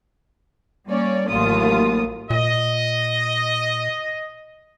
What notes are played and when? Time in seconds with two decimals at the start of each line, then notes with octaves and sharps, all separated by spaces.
0.88 G3 A#3 C#4 C#5 D5
1.30 A1 D#2 F#3 A3 F4 D#6
2.30 A#2 D#5